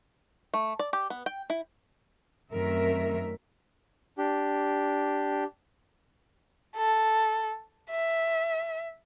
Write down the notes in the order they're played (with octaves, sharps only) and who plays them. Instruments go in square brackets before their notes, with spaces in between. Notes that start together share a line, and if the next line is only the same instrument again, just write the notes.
[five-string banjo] A3
D5
G4
B3
G5
E4
[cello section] F#2 D#3 A3 C4 A#4 E5
[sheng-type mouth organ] D4 G4
[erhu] A4
E5